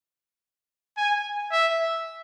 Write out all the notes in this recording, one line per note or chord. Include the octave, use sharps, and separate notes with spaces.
G#5
E5